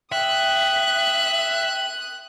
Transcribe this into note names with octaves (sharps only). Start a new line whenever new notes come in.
E5 G5 D#6 F#6